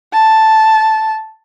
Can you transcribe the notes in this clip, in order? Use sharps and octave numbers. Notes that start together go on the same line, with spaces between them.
A5